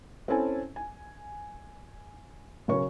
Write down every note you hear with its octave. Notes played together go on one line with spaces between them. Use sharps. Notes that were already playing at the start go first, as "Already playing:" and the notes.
C4 C#4 E4 A4 G#5 A5
G#5
B1 C#3 A#4 C#5 C#6